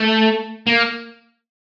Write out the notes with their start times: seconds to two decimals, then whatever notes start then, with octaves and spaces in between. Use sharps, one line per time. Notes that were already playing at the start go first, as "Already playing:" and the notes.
Already playing: A3
0.67 A#3